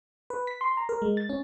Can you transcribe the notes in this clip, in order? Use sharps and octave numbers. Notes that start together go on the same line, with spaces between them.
B4
B6
C6
A#5
A#4
G#3
A6
C#4